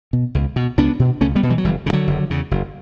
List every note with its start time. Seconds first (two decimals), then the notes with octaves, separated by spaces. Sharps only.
0.13 B2
0.35 C#2
0.56 B2
0.78 C#2 B3 D4
0.99 B2
1.21 C#2 A3 C#4
1.35 G3 B3
1.43 B2
1.50 E3 G3
1.58 F#3
1.65 F#1 E3 G3
1.86 E2 C#3
1.93 D3 F#3
2.07 F#1
2.30 E2 C#3
2.51 F#1